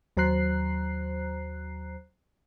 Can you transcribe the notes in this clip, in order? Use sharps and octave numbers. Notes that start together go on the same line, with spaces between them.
D#2 F#3 C5 A#5 F#6 C7